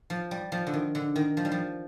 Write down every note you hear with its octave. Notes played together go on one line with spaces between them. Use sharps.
F3
G3
F3
D3
D#3
D3
D#3
F3
G3
F3